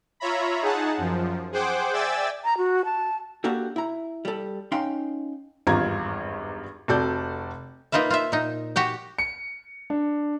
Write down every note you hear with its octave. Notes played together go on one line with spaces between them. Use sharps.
F4 C#5 E5 A#5 B5
D#4 G#4 F#5 A5
F#2 F3
G#4 C5 F#5 G5 D6
D5 E5 G5 G#5 E6 A6
A#5
F#4
A5
A#3 D4 F#4 G4 A4
E4 A#5
G3 A4
C#4 D#4 F5 G5 C6
G#1 E2 G2 F4 A#5 G#6
F1 F#4 A4 D5 G6
A#3 D#4 F4 B4 E5
F4 C5 E5
A#2 D#4
F#4 G4 G5
C#7
D4